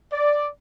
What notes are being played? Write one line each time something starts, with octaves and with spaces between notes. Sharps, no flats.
D5